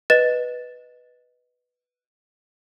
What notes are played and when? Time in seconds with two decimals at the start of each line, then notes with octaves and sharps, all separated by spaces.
0.10 B4 D#5 A6 E7